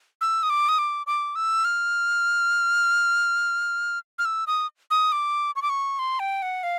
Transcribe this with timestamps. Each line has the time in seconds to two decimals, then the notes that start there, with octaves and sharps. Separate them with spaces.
0.21 E6
0.43 D#6
0.50 D6
0.69 D#6
0.78 D6
1.07 D6
1.36 E6
1.65 F6
4.19 F6
4.25 E6
4.47 D#6
4.91 D#6
5.12 D6
5.56 C#6
5.62 D6
5.69 C#6
5.99 C6
6.20 G5
6.42 F#5
6.63 F5